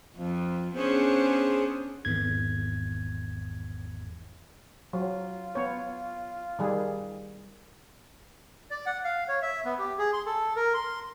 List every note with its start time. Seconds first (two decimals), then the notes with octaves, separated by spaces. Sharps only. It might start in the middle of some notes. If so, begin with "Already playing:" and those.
0.16 F2 F3
0.75 B3 C#4 D4 G#4 C5
2.05 G#1 E2 G#6
4.93 F#3 F4
5.55 B3 C#5
6.59 D#3 G3 G#4
8.70 D5
8.86 F#5
9.05 F5
9.28 C#5
9.42 E5
9.65 B3
9.79 G4
9.98 G#4
10.13 C6
10.26 A4
10.56 A#4
10.74 C6